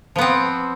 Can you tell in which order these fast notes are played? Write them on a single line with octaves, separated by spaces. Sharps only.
F3 B3 C4